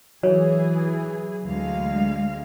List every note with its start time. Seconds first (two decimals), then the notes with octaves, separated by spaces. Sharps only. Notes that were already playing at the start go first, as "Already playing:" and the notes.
0.23 E3 F#3 G#4 C#5
1.45 D2 G#3 F5